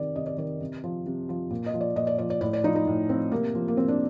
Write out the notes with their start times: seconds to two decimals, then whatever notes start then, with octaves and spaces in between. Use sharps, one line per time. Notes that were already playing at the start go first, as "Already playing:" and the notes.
Already playing: C3 D#3 D5
0.16 C3 D#5
0.26 D5
0.38 D#3 D5
0.61 C3
0.84 F3
1.06 C3
1.29 F3
1.51 A#2
1.66 D#5
1.74 F3
1.81 D5
1.96 A#2 D#5
2.07 D5
2.18 F3 D5
2.30 D5
2.41 A2 D5
2.53 D5
2.63 F3 D#4
2.75 D#4
2.87 A2
3.09 F3 C4
3.32 C3 A#3
3.55 F3
3.68 A#3
3.76 C3 C4
3.88 D4